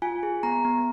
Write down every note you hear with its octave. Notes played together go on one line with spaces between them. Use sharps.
F4 G#5
G#4
B3 A#5
B3